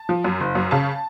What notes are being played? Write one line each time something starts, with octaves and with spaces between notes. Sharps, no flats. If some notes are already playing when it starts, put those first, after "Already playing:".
Already playing: A5
F3
F#2
F#1
F#2
C#3 A5